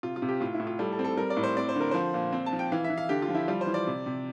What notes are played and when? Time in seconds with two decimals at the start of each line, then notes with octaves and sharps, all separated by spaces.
0.03 C3 F4
0.16 F4
0.22 C3
0.29 G4
0.41 A2 F4
0.54 E4
0.60 A2
0.67 F4
0.79 G3 A4
0.92 A4
0.99 C4
1.04 A4
1.17 G3 A#4
1.30 D5
1.37 A2
1.43 C5
1.57 C4 D5
1.69 C5
1.75 D3
1.80 A#4
1.91 F3 C5
2.14 A#2
2.33 C4
2.46 A5
2.53 F3
2.59 G5
2.72 E3 F5
2.84 E5
2.90 E3
2.97 F5
3.09 D3 G4
3.22 F4
3.29 F3
3.35 E4
3.48 G3 F4
3.61 C5
3.67 E3
3.74 D5
3.87 C3
4.06 C3